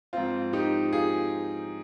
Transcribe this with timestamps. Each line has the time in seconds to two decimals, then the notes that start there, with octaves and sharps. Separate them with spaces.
0.13 G#2 F3 C4 F4
0.53 D#4 G4
0.93 F4 G#4